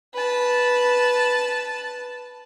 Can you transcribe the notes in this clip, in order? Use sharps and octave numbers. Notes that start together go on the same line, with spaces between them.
B4 A5